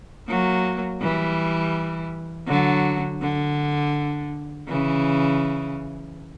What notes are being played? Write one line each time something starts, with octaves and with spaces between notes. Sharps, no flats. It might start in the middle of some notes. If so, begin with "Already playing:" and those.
F#3 A#3
E3 G3
D3 F#3
D3
C#3 E3